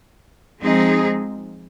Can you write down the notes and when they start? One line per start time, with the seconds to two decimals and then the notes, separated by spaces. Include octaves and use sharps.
0.60 F3 G#3 C4 D#4 G#4